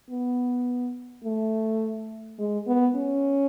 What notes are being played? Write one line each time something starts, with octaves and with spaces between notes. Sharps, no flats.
B3
A3
G#3
B3
C#4